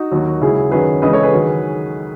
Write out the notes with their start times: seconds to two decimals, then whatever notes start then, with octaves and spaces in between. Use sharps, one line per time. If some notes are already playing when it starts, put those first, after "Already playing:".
Already playing: D#4 F#4
0.11 D#2 D#3 F#3
0.41 C#2 C#3 F#3 E4 G#4
0.71 F#2 D#3 F#3 G#4 B4
1.02 C#2 C#3 E3 B4 D#5
1.13 A4 C#5
1.23 G#4 B4
1.32 D#3 F#3